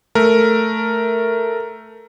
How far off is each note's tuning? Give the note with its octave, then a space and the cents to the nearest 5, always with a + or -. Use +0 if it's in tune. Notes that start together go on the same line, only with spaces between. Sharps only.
A3 +0 A#4 +0